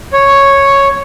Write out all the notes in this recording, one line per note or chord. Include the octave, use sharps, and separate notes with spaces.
C#5